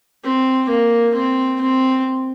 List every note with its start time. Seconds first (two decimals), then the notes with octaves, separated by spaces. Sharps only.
0.24 C4
0.69 A#3
1.14 C4
1.61 C4